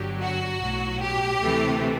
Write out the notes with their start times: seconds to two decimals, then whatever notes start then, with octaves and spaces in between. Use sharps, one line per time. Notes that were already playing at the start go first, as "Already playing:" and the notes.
Already playing: G1 G2 D3 F#3 G4
0.21 F#4
0.60 B1 A2 F#3
1.01 G4
1.41 D2 C3 E3 A3